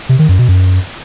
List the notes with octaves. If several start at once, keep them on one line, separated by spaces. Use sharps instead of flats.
C3
D#3
F#2
B2
F#2